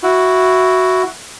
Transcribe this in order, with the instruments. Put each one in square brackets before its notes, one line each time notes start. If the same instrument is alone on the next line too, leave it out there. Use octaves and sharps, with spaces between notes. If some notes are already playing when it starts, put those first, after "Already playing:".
[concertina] E4 F#4